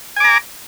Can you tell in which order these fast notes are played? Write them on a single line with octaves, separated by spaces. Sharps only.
G#5 D6 A#5